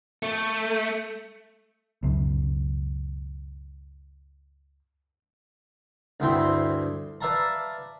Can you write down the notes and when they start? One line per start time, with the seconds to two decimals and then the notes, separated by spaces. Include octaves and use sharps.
0.23 A3
2.03 C#2 F#2 B2
6.20 D2 G2 C4 E4 G5 C6
7.21 B4 D5 E5 F5 A5 A#5